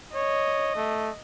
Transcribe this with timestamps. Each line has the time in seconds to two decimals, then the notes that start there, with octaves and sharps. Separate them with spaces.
0.15 C#5 D#5
0.76 A3